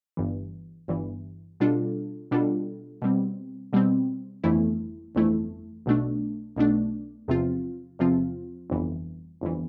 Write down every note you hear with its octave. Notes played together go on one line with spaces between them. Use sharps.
G1 G2 E3
G1 G2 E3
B2 G3 D4 F4 A4
B2 G3 D4 F4 A4
B2 G3 C4
B2 G3 C4
G1 F2 E3 A3 E4
G1 F2 E3 A3 E4
B1 B2 A3 D4
B1 B2 A3 D4
E2 C3 F3 C4 F4
E2 C3 F3 C4 F4
G1 F2 E3
G1 F2 E3